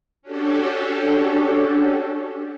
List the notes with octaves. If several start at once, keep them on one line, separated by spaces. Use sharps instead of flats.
C#4 D4 F#4 G4 A4